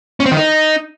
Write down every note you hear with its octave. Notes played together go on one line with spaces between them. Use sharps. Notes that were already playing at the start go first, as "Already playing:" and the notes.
C#4
C4
D#3
D#4